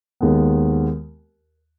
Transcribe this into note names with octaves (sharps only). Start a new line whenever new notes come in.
D#2 D#3 G#3 B3